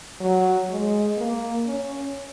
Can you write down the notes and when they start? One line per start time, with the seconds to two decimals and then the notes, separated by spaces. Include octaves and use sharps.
0.20 F#3
0.70 G#3
1.17 A#3
1.66 C#4